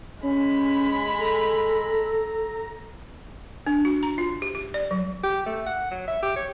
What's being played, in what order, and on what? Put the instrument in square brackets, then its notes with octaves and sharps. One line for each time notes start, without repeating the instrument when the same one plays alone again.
[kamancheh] G#3 B5 [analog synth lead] C#4
[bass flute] A4 [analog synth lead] A#5
[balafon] D4
F#4
A#5
F4
G4
G4
D5
F#3
[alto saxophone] G4
A3
F#5
F#3
E5
G4
C#5